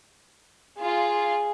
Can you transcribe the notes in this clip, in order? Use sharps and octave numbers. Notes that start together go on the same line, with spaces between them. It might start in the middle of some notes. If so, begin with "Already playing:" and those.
F4 G#4